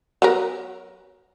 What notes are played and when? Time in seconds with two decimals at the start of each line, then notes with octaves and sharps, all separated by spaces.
0.22 F#3 B3 A#4